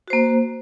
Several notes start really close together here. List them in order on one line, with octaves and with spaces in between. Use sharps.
F#4 C5 A#3